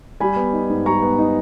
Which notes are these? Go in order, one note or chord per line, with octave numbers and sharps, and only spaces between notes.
G3 G#5 B5
B3
D#4
G#2
G3 A#5 C#6
B3
D#4